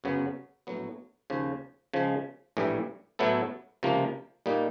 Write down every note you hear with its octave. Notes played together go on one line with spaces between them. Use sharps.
G1 F#2 C#3 F#3 B3
A#1 A2 F#3 B3
D#2 C#3 F3
C#3 F3 G#3
A#1 A2 E3 G3
A2 F#3 B3 E4 A4
C#2 C3 F3 A#3
A#2 G3 A#3 D#4